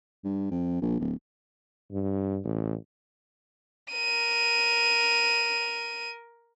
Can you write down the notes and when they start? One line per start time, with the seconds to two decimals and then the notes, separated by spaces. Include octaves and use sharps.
0.24 G2
0.51 F2
0.82 A#1
0.99 D1
1.91 G2
2.44 A1
3.92 A#4 D#7